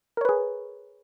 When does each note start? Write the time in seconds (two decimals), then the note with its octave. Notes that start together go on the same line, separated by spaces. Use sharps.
0.17 A#4
0.21 C#5
0.25 B4
0.29 G#4